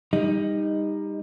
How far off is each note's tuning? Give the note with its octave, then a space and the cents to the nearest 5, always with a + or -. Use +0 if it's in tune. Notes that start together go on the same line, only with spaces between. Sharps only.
G3 +25 D#4 +0